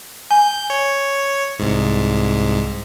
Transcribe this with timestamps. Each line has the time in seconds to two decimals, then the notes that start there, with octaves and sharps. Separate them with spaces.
0.31 G#5 G6
0.70 C#5
1.59 C2 G#2